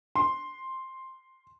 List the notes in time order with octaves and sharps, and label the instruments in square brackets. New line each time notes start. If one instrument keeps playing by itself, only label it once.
[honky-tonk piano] C6